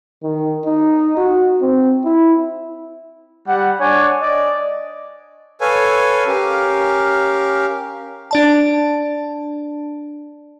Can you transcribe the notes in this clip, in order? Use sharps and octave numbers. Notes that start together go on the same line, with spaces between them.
D#3
D#4
F#4
C4
E4
G3 F#5
D4 C#5 G#5
D5 D#5
A4 B4 C#5 F5 G#5
C#4 G4 A#4 F5
D4 D5 A5